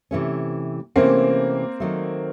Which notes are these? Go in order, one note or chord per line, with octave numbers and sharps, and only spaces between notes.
C3 E3 A3 C#4
C3 E3 A3 A#3 C4 C#4
D#3 F#3 A3